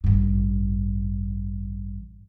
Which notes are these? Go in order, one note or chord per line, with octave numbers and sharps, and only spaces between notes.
A1 G2